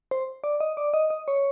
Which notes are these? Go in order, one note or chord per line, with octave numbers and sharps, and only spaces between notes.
C5
D5
D#5
D5
D#5
D#5
C#5